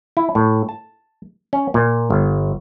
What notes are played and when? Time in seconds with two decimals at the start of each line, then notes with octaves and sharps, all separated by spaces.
0.17 E4
0.35 A2
0.69 A5
1.53 C#4
1.74 A#2
2.10 G1